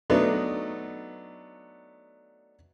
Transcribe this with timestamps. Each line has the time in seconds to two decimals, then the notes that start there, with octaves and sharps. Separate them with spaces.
0.10 F#3 A3 B3 D4 D#4